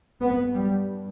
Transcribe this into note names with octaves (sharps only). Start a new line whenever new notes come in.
G2 B3
G3